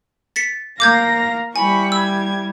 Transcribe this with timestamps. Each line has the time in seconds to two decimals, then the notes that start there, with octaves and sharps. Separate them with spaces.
0.36 A6 B6 C#7
0.80 A#3 F5 A#5 D6 G6 G#6 A#6
1.56 G3 E4 G#5 B5 C#6
1.92 E6 G#6